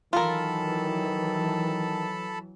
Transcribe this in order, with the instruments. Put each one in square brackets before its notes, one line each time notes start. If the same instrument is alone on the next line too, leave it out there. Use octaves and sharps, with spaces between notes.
[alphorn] D#3 [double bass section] E3 F#3 [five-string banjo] F4 A#4 [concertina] A4 A5 B5